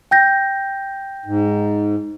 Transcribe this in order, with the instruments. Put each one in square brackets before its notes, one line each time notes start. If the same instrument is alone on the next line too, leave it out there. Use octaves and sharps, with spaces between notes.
[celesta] G5 G6 A#6
[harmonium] G#2